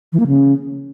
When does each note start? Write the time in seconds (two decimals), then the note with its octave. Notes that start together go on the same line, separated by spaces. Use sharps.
0.13 E3
0.20 A#3
0.27 C#3